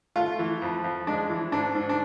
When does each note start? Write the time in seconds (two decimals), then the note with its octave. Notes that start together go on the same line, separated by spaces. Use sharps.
0.16 A3 F4
0.39 E3
0.62 F2
0.84 F2
1.07 G#3 D4
1.30 E3
1.52 G#2 D4
1.75 G#2
1.89 D4